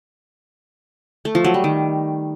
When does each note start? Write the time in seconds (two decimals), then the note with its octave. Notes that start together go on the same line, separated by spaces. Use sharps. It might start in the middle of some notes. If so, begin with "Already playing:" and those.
1.25 A3
1.35 F3
1.45 F#3
1.54 G3
1.64 D#3